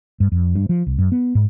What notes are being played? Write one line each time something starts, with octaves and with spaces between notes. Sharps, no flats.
G2
F2
G2
F3
C2
F#2
B3
G#2